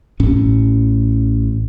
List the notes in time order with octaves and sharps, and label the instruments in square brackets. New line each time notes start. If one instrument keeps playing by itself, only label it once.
[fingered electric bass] A1 A2 C#4